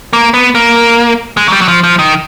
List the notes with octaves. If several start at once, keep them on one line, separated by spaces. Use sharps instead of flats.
A#3
B3
A#3
G#3
F#3
G3
F#3
F3
F3
D#3